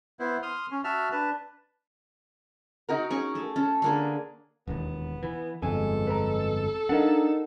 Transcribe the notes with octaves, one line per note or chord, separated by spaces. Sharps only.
B3 E4 C5
C6 D#6 F6
C#4
F#4 E5 A5 F6
D4 B4 A5
D#4 F#4 A#4
C#4 G#4 C#6
A3
C#4 A4
D3 A#3 G#4
E1 D#2 B3
E3
G1 F2 B2 G#3 A4 G#5
B4 A#5
D4 D#4 A#4 F5 F#5